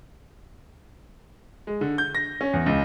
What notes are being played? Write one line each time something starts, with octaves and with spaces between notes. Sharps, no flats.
G#3
D3
G6
A#6
C#4
E2
C#2